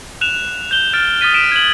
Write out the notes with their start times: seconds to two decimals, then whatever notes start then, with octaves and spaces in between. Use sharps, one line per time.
0.21 F#6 E7 F7
0.71 G6 G7
0.94 F6 A6 D7
1.21 D#6 F6 A6 B6 D#7
1.34 B6 D7 E7
1.52 G#6 F#7